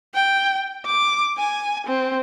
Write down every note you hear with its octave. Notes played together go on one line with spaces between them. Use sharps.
G5
D6
G#5
C4